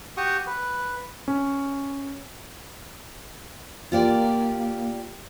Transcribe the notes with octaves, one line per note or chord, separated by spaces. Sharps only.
F#4 G4 C#6 D#6
B4
C#4
A#3 F4 G4 D5